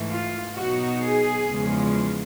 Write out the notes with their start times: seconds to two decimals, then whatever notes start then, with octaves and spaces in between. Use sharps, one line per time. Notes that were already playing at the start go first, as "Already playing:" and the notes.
Already playing: G#2 E3 A3
0.09 F4
0.55 B2 F#3 B3 D#4 F#4
1.02 G#4
1.48 E2 C#3 F3 G#3